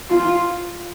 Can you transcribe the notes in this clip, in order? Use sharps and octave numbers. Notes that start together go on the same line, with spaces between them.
F4